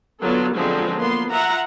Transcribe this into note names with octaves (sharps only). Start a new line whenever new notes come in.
D3 F#3 B3 F4 A4
D3 F3 F#3 G#3 B3 C4
A#3 B3 C6
F4 E5 F#5 A#5